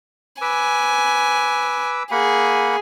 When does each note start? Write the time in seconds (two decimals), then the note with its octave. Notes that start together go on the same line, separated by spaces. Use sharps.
0.42 B4 G#5 D6 E6
2.11 A#3 G#4 F#5 B5